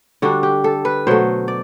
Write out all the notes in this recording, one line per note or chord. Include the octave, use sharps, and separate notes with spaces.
D3 G3 D4 F#4
G4
A4
B4
B2 F#3 A3 C5
D5